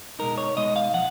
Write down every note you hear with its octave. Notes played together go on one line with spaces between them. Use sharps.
B2 G#3 D#4 A#4
C#5
B2 G#3 D#4 D#5
F5
F3 F#5